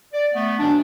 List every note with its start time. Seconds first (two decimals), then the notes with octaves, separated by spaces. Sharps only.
0.13 D5
0.34 A3 B3
0.60 B2 E3 F#3 D4